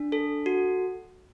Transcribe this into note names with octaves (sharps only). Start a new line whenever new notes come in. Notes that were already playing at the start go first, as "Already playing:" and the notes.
Already playing: D4
A4
F#4